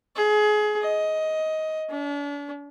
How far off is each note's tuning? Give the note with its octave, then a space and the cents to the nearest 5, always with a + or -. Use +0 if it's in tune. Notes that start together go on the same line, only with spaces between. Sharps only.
G#4 +25
D#5 +15
D4 -40